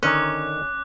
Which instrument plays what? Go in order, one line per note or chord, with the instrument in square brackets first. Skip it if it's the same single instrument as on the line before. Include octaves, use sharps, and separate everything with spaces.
[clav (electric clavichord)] D3 D#3 A#5 [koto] C#4 [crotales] D6 F#6